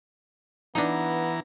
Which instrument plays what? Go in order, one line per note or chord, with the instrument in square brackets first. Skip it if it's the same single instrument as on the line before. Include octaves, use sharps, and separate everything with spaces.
[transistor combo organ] E3 A#5 [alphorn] B3 [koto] D4 D#4